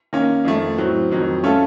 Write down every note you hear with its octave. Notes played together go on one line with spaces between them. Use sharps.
D#3 A#3 C#4
F2 D#3 A3
A2 F#3 C4
F2 D#3 F#3 C4
A3 C#4 F4 A4